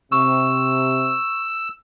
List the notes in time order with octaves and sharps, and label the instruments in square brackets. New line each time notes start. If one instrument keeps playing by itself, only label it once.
[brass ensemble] C3 [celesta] C#6 [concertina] E6